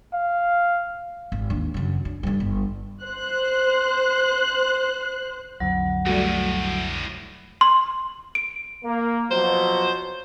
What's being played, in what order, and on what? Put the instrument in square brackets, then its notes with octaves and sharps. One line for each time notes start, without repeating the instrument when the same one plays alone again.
[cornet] F5
[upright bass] G#1
D#2 D4
F#2 C#3
D4
G2 D3
G1
[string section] C5 F#6
[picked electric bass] B1 F2 D3 [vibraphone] F#3
[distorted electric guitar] D2 A2 [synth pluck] G3 A3 F#4
[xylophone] C6
D7
[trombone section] A#3
[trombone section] B2 F3 F#3 [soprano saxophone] C5